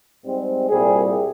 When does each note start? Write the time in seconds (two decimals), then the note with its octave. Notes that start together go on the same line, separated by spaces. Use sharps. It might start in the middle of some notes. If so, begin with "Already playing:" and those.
0.25 G#2 G3 C4
0.69 C2 A#2 G3 G#4